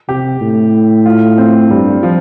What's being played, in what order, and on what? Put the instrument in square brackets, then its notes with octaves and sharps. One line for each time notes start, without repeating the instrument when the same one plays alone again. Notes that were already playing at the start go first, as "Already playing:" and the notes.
[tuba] C3 [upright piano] G4
[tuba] A2
[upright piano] F4
C4
[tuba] G2 [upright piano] G3
[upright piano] F3